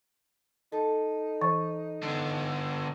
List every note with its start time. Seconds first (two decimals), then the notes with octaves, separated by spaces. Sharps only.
0.72 D#4 A4
1.42 E3
2.03 D3 B3